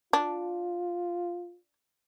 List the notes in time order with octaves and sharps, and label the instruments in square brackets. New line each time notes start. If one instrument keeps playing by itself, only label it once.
[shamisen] D4 [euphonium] F4